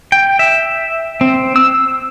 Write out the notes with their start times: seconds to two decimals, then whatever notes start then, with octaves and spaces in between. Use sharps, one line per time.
0.12 G5
0.39 E5
1.21 C4
1.56 E6